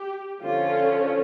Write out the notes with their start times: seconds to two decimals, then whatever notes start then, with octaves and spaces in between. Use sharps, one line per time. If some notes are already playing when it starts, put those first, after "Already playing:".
Already playing: G4
0.43 D3 F3 C#4 F4